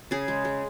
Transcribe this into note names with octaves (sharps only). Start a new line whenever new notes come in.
C#3 G#4
G#3
G#3